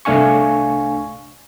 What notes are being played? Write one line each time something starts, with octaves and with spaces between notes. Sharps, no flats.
C2 A3 D4 F5 G#5 C#6